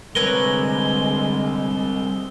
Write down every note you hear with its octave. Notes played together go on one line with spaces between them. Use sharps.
D3 G3 G#3 C4 A#4 B4 C#5 G7